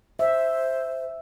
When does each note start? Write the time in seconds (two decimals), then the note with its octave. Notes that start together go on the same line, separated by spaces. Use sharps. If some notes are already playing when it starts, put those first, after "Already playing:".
0.19 C5 E5